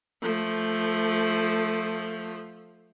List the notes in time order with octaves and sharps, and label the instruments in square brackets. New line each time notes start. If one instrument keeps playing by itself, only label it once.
[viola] F3 A3